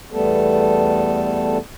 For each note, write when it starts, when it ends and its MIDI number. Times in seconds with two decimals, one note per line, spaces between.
0.12 1.57 40
0.12 1.57 55
0.12 1.57 57
0.12 1.57 59
0.12 1.57 69